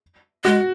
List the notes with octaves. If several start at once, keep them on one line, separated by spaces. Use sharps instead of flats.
G#3 F#4